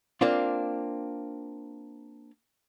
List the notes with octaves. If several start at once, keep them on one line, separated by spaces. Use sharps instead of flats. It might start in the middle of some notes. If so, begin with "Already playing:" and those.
A#3 C4 D4 F4